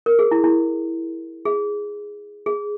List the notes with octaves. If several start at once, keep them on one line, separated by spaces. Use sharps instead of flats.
A#4
G#4
E4
E4
G#4
G#4